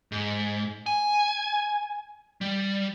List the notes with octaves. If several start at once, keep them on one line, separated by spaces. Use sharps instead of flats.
G#2
G#5
G3